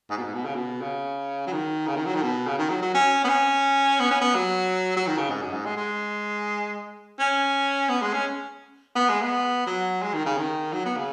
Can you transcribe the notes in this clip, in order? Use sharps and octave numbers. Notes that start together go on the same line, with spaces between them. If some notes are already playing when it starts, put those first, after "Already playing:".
G#2
B2
G#2
B2
C#3
B2
C#3
F#3
D#3
C#3
D#3
F#3
D#3
B2
C#3
D#3
F#3
F#3
C#4
B3
C#4
B3
C#4
B3
F#3
F#3
D#3
C#3
G#2
F#2
G#2
G#3
G#3
C#4
B3
G#3
C#4
B3
G#3
B3
F#3
G#3
D#3
C#3
D#3
F#3
B3
C#3